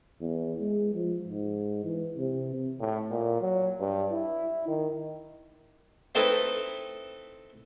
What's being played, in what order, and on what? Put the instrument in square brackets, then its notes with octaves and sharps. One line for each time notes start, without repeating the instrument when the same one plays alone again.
[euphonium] E2
G#3
F3
G#2
E3
C3
A2
A#2
F#3
G2
E4
D#3
[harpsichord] A3 C4 D#4 E4 A4 B4